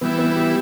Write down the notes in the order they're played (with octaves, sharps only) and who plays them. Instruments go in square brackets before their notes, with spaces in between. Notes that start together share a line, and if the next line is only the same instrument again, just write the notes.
[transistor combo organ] E3 G3 E4 [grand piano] B3
[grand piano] B3
G4